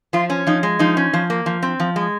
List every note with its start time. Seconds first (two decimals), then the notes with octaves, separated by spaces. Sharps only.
0.13 F3 F4
0.30 C#4
0.47 F3 D#4
0.63 G#3
0.79 F3 D#4
0.97 C#4
1.13 F3
1.30 A#3
1.46 F3
1.63 C4
1.80 F3
1.96 G#3